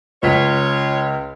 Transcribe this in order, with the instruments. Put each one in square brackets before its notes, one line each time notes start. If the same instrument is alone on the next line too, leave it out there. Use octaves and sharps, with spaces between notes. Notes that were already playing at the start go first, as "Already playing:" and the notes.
[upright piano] C#2 B6 [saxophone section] F4 C#5